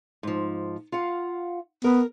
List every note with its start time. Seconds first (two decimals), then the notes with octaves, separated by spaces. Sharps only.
0.23 G#2 F3
0.92 F4 F5 F#5
1.84 B3 A#4